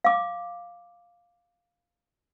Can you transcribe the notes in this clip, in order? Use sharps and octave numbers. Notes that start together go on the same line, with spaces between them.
F5 D6